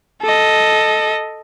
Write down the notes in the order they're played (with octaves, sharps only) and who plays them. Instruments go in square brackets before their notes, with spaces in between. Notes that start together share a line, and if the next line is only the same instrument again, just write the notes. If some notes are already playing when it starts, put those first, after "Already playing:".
[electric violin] A4 D#5